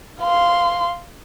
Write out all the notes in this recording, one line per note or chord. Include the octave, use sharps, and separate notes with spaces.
F5 C6